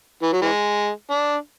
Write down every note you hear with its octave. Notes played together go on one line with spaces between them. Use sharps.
E3
F#3
E3 G#3
D4